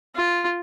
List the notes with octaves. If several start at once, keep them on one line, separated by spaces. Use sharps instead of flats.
F4